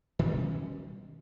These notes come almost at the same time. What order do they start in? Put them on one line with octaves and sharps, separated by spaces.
D#3 G3 B2 C#4